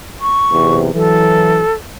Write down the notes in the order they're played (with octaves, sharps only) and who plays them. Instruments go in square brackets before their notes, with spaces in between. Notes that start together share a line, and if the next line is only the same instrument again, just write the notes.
[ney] C#6
[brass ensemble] B1 E2 C3
[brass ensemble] E3 F#3 [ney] A4